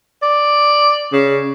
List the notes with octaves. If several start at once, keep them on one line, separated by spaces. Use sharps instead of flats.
D5
C#3